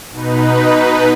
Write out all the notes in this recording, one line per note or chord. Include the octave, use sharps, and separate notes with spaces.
B2 D#4 B4